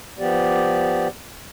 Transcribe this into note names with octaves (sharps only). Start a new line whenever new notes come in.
F3 B3 G4 D5